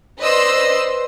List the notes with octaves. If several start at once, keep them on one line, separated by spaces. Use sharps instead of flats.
B4 C5 D5 D#5 C6 E6